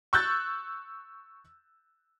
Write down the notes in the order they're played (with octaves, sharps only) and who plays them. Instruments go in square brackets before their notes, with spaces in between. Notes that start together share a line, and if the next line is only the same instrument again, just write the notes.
[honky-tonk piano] C#6 E6 F#6 G6 A6